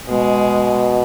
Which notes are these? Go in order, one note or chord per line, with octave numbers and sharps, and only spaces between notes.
B2 G#3